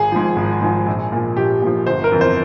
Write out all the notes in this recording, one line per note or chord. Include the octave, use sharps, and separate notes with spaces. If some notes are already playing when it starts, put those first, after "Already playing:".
Already playing: G#1 G#4
G#2 F3
G#1
G#2 F3
A#1
A#2 F3
A#1 G4
A#2 F3
G1 C5
A#4
F2 E3
C5